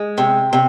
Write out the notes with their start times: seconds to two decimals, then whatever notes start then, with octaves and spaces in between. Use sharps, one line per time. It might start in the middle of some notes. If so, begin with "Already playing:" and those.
Already playing: G#3
0.18 C3
0.53 C3